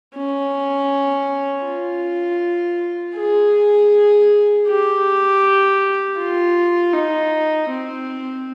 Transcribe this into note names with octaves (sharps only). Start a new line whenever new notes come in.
C#4
F4
G#4
G4
F4
D#4
C4